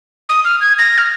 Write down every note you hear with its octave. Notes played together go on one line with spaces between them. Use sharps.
D#6
F6
G#6
A#6
F6